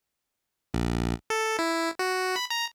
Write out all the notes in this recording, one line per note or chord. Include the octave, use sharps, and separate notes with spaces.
A#1
A4
E4
F#4
B5
A#5